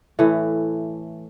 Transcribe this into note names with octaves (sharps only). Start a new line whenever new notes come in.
A2 E3 A3